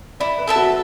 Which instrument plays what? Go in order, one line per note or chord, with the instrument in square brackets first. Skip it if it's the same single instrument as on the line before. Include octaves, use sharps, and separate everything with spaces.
[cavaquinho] E4 [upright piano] D5
[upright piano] B4
[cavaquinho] A4 E5 A5
[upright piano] F#4